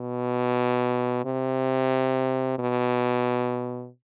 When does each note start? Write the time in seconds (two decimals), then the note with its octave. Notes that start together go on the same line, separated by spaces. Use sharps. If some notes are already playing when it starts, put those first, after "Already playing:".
Already playing: B2
1.25 C3
2.59 B2